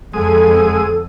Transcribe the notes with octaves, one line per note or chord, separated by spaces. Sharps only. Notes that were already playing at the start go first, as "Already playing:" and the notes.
F2 D3 G#3 A4 D#6